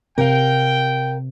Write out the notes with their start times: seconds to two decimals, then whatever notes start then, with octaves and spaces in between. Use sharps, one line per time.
0.18 C3 A#4 F5 G5